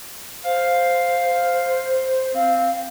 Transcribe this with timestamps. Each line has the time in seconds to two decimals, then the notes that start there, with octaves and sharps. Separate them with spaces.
0.45 C5 F5
2.34 C4 F5